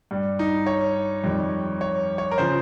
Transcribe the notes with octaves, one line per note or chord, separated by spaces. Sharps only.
G2 G3
D#4
C#5
F2 D#3 G3
C#5
C#5
A#4
C#3 F3 C5